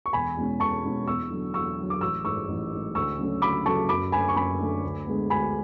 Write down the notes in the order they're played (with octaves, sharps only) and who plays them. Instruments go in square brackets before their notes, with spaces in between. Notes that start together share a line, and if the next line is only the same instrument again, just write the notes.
[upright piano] C#6
E1 G#5 B5
E2 B2 G#3 C#4
E1 A5 C#6
E2 B2 G#3 C#4
E2 C#6 E6
D3 F#3
E2 C#6 E6
D3 F#3
D6
A1 C#6 E6
G#2 G#3 C#6 E6
A1
G#2 G#3
D2 C#6 E6
C#3 F#3 A3 C#4
D2 B5 D6
C#3 F#3 A3 C#4 A5 C#6
F#2 B5 D6
D3 A3 G#5 B5
C#6
F#2 G#5 B5
D3 A3
D2
D3 G#3 B3
D2 G#5 B5